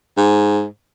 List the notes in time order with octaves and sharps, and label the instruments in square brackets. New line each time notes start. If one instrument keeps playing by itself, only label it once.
[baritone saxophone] G#2